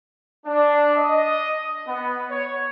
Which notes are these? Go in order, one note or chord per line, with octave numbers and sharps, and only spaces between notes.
D4
D#5
B3
C#5